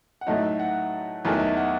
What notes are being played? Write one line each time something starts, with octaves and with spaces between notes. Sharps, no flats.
F#5
A2 F#3 A3 D#4 E5
E5
F#5
E2 D#3 F#3 A3 E5
D#5
E5
F#5